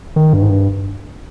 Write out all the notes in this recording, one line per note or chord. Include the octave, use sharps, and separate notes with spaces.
D#3
G2
G#2
G2